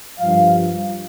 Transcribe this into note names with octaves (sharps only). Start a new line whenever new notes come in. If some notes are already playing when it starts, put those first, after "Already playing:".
G2 F3 F5